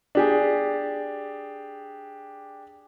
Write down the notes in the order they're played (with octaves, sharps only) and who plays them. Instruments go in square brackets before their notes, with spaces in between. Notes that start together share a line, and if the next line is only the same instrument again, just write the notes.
[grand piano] D4 G4 G#4